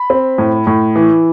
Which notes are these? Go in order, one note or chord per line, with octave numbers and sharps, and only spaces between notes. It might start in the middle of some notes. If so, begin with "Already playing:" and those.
Already playing: B5
C4
A2
A2
E3